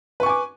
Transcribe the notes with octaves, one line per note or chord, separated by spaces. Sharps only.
B4 G#5 C#6 D6